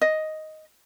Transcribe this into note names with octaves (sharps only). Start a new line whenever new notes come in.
D#5